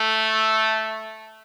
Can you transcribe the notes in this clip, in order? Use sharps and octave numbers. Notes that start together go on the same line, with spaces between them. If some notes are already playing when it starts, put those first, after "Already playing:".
Already playing: A3